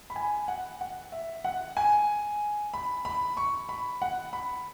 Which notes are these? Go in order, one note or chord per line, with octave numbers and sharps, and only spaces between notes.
B5
G#5
F#5
F#5
E5
F#5
G#5
B5
B5
C#6
B5
F#5
B5